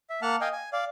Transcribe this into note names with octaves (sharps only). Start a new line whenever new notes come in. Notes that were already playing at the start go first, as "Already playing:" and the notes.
E5
A#3 F#5 A5 F6
D#5 F5 G5 G#5
G#5
D5 F5